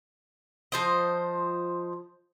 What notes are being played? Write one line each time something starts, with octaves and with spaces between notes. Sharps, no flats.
F3 C5 D#5